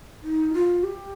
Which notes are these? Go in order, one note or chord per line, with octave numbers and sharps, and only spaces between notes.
D#4
F4
G4